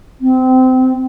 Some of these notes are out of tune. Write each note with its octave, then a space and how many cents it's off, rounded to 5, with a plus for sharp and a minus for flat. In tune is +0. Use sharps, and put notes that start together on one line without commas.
C4 -25